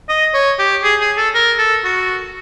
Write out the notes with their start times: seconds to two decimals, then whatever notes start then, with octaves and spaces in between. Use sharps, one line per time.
0.09 D#5
0.34 C#5
0.59 G4
0.83 G#4
1.00 G#4
1.17 A4
1.34 A#4
1.59 A4
1.84 F#4